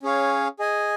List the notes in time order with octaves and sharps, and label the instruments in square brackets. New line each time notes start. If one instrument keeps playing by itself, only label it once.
[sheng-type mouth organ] C#4 G#4 C#5 F5
G#4 D#5 G#5